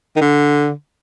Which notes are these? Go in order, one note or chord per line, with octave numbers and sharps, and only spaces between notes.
D#3
D3